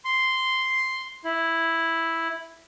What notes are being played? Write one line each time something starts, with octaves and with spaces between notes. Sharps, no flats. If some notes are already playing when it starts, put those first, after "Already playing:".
C6
E4